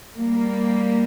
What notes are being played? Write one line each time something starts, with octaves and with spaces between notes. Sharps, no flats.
G3 A#3